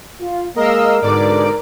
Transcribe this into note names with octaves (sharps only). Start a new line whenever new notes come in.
F4
G#3 A#3 A#4 D#5 F5 E6
G#2 B2 D3 D5 D6